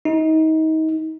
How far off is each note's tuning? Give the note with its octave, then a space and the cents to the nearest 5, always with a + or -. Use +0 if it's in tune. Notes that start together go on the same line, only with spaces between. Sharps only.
D#4 +30